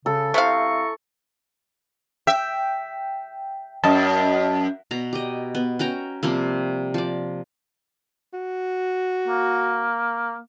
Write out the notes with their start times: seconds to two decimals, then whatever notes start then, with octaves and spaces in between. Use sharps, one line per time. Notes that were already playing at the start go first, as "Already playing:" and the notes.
0.06 C#3 A4
0.34 C3 C4 E4 F5 A#5 C#6
2.27 E5 G5
3.84 F#2 D#5 A5
4.91 B2 A#5
5.13 G4 D#5
5.55 B3
5.79 C#4 F#4 G5 A#5
6.23 C3 F3 G3 A#3
6.94 F3 D5
8.33 F#4
9.28 A#3